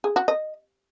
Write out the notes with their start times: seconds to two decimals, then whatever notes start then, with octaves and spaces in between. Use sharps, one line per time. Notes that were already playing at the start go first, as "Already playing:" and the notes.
0.04 G#4
0.16 F#4
0.28 D#5